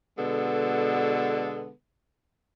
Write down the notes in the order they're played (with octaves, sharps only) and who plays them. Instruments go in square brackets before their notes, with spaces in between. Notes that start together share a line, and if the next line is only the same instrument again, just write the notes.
[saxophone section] B2 D3 G#3 B3 A4